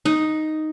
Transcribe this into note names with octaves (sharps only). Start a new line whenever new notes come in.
D#4